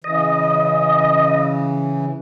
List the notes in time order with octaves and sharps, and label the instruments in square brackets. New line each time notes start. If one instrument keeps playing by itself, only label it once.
[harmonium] C#3 E3 [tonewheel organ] D#5